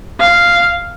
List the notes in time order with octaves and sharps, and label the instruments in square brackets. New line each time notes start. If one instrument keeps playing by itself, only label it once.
[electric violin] F5